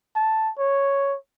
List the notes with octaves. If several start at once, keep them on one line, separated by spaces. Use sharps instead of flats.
A5
C#5